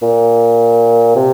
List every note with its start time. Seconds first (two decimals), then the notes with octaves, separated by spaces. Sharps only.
0.02 A#2
1.16 C3